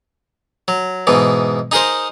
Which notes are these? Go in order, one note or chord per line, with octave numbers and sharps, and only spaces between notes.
F#3
G#2 B2 E3
D#4 G#4 A#4 C5